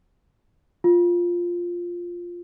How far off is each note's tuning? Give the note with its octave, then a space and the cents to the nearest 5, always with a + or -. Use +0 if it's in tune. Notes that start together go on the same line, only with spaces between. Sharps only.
F4 +5